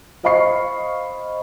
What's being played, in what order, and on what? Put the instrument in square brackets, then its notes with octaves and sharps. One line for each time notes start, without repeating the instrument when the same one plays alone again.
[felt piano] C5 D#5 F5 B5 C#6 C7